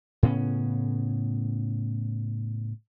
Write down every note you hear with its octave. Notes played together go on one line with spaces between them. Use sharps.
A2 C#3 B3 C#4